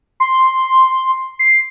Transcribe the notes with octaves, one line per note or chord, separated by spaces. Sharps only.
C6
C7